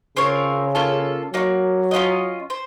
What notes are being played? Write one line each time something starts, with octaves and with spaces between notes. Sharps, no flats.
C#3 C4 F4 A#4 C#5
A#3 C#4 F4 A4
F#3 A#3 D#4 F#4
C#4 F4 C5 D#5
C5